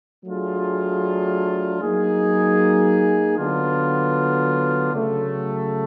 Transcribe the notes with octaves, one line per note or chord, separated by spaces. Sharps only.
F#3 A3 D4 F4 G#4
F#3 A#3 D#4 G#4
D3 F#3 B3 D4 F4
C#3 F#3 A3